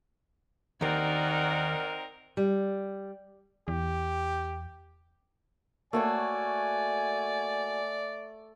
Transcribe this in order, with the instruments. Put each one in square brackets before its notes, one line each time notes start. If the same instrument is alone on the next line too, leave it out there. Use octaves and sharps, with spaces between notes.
[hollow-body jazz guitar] D#2 D#3 [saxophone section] C4 D#4 A#4 [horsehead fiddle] D5 F#5
[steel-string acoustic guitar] G3
[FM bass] E2 [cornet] G4
[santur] A3 [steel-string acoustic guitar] A#3 F#4 C#5 [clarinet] D5 [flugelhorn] G#5